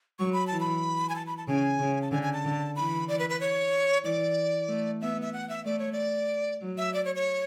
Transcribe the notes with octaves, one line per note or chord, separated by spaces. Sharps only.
F#3 C#6
B5
E3 A5
B5
G#5
A5
B5
A5
C#3 G#5
C#3
A5
D3 G#5
G#5
A5
D3
E3 B5
D5
B4
B4
C#5
E3 D5
A3
B3 E5
E5
F#5
E5
A3 D5
C#5
D5
F#3
E5
D5
C#5
C#5